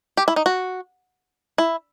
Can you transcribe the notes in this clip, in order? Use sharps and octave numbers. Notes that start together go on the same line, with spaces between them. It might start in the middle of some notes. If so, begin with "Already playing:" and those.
G4
E4
D#4
F#4
E4